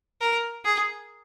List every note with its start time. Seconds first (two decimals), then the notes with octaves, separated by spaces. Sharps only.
0.21 A#4
0.65 G#4